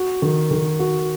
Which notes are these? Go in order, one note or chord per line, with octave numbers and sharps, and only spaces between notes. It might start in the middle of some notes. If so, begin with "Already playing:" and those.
Already playing: F#4
D#3
D#3
F#4